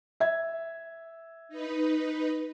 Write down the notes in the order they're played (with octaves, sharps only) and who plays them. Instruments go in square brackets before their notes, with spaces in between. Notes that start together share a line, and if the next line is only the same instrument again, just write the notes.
[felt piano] E5 G#6
[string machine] D#4 B4